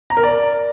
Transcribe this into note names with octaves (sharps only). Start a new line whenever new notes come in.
A#5
A#4
D5